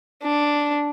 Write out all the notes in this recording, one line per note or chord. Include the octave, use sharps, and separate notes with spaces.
D4